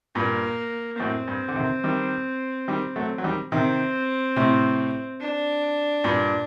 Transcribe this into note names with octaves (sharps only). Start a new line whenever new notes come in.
G2 A#2 A#3
F#2 A2 C4
G2
D3
C3 D#3
D#3 G3
D#3 G3
F#3 A3
F#3
D#3 G3
C3 D#3 C4
A2 C3
D4
G2 A#2